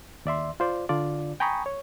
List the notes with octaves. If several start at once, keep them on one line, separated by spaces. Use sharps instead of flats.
D#2 D5 E5 C6
F4 C5 D5
D3 D4 F4 D5
G5 G#5 A#5 B5 C#6 D#6
C#5